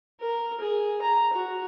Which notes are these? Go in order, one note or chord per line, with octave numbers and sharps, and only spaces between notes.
A#4
G#4
A#5
F#4